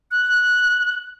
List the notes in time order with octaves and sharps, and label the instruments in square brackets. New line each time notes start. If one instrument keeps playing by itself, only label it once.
[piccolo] F#6